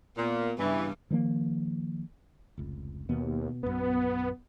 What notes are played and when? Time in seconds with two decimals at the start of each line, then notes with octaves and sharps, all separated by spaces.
0.17 A#2 B3
0.58 G2 C#3 E3 G3
1.11 D#3 F3 A3 A#3
2.58 F1 C#2
3.09 D#2 B2 B3
3.63 A#1 F#2 B3